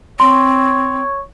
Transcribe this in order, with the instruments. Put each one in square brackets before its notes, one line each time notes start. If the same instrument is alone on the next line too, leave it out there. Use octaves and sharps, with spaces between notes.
[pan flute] C4 [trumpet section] C#5 [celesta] C6